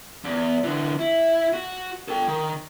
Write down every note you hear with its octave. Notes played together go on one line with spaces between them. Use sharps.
E2
D3 E3
E4
F#4
A4 G5
D#3